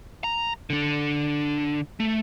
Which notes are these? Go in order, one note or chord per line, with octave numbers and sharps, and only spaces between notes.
A#5
D3 D4
A3